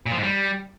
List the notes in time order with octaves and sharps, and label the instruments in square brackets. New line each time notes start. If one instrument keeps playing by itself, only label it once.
[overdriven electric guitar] A#2
F3
G#2
G3